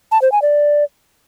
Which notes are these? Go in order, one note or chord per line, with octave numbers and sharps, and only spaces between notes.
A5
C5
G#5
D5